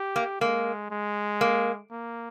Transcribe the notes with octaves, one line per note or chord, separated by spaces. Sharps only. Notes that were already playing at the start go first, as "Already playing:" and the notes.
Already playing: G4
A#3
G#3 A#3
G#3
A#3
A#3